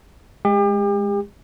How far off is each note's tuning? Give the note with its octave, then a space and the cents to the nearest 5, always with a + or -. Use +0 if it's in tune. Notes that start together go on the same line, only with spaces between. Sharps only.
G#3 +0 G4 +40